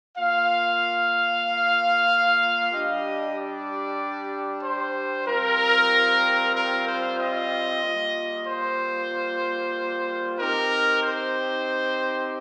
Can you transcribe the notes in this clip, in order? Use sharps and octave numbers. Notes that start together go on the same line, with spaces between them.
A#3 F4 F5
G3 D4 G4 D#5
D5
C5
G3 C4 F4 A#4
A#4
C5
D#5
G3 A#3 F4
C5
C4 D#4 G4 A#4
C5